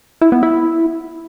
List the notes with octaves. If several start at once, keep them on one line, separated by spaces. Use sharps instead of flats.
E4
B3
E4